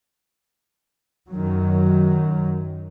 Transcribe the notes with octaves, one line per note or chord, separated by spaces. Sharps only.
F#2 D#3 F#3